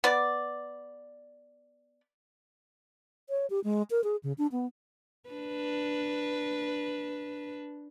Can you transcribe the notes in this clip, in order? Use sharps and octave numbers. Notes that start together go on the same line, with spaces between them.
B3 D5
C#5
G4
G#3
A#4
G#4
C#3
D4
B3
D4 B4